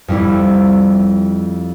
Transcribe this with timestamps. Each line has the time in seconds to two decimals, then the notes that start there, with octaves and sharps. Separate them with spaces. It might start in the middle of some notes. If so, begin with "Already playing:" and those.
0.08 F2 G3 E4